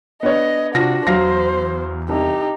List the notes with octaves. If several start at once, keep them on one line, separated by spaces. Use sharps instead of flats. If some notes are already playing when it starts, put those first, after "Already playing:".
B3 D4 C#5 D#5
C3 D4 F4 F#4 A#6
E2 F#3 C5 F5 A#6
C2 D#4 G4